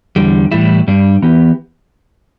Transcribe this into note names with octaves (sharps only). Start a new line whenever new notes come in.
E2 D3 G3
A2 E3 G3 E4
G2 G3 D4
E3 B3 G4